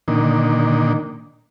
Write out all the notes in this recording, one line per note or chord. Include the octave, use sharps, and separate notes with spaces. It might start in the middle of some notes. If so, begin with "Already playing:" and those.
A#2 D3 D#3